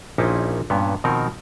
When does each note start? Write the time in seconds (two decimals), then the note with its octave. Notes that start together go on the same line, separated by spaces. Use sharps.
0.18 A#1 A#2 F3 C#4 D#4 E4
0.70 G2 A#2 B3 C#4
1.04 B2 D#3 F3 C4 D#4 A#4